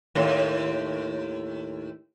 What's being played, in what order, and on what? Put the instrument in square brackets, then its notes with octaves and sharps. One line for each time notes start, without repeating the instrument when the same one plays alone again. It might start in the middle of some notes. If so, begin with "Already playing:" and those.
[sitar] D#2 A2